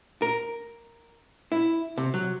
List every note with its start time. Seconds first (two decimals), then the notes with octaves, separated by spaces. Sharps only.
0.22 A#4
1.52 E4
1.98 C3
2.14 F#3